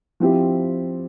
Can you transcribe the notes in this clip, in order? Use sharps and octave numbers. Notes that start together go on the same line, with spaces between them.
F3 C4 E4 G4